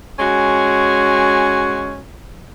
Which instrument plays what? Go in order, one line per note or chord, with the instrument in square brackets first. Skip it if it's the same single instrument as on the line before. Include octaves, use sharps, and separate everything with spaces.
[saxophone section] G#3 C#4 F#4